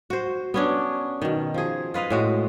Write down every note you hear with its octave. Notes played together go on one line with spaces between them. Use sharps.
F#4 C5
B3 C#4 D4
B2 D#3
F3 G#4
F4 B4 D#5 F5
A2 G#3 F#4